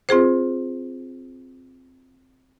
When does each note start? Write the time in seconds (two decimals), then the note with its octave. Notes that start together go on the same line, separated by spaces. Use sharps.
0.09 C4 F4 G#4 C5